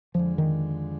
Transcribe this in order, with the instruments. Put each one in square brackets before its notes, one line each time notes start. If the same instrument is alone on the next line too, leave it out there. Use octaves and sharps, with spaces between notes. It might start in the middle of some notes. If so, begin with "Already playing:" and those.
[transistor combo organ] F2 D3 G#3 [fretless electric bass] F3
[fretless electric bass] D#3